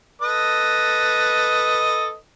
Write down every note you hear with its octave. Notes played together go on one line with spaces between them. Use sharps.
A4 B4 D#5